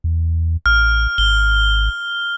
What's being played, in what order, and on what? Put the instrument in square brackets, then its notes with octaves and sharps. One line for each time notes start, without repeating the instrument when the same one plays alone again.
[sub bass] E2
[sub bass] A1 [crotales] F6
[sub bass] G#1 [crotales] G7